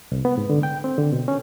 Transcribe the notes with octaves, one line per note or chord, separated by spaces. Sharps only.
C2
B3
G#2
D3
G5
C4
D3
B2
C#4